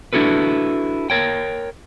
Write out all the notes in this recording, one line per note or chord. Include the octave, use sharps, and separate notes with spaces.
D4 E4 F#4 A4 B4
A#4 C#5 G5